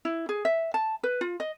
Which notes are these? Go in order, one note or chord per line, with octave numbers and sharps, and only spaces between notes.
E4
G#4
E5
A5
B4
F4
D#5